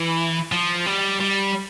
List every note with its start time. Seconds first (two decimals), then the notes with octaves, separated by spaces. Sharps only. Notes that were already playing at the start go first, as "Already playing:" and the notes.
Already playing: E3
0.52 F3
0.86 G3
1.20 G3